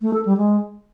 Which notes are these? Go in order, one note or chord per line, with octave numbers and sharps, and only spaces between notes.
A3
A4
G3
G#3